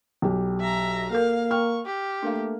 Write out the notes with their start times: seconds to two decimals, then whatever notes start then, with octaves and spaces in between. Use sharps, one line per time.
0.22 B1 G4
0.60 E5 A#5
1.11 A#3 A4 A#4 F5
1.51 G5 C#6 F6
1.86 G4
2.23 A3 A#3 D4 A#4 F5